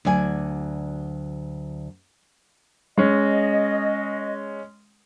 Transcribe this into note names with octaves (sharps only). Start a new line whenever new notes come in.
D2 F#3 D5 G#5
G#3 C#4 D#5